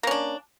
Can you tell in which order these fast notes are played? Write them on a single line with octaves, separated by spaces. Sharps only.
A#3 C#4 D4